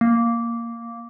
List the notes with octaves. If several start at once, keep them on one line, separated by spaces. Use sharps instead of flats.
A#3